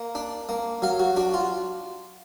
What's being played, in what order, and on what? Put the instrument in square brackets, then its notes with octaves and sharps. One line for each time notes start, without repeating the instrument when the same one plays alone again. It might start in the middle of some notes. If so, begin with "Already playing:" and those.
Already playing: [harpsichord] A#3
D4
A#3
F#3 F5
F#4
D4 F#4
F4